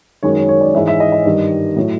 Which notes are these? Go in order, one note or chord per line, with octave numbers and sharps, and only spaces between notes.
F#2 D#3 G#3 C#5
C#5
C#5
D5
G#2 E3 G#3 E5
E5
D#5
D#5
G2 D#3 G3
A2 F#3